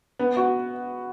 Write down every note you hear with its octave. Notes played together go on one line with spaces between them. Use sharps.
B3
F#4